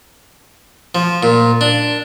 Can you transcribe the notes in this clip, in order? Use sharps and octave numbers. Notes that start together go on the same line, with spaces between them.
F3
A#2
D4